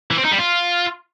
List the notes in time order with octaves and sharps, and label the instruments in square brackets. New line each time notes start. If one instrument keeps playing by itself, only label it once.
[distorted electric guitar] E3
C4
D#4
G3
F4